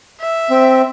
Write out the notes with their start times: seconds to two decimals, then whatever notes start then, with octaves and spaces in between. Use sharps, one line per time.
0.20 E5
0.50 C4